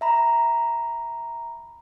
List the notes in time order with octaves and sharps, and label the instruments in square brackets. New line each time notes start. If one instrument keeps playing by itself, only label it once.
[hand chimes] E5 A#5 B5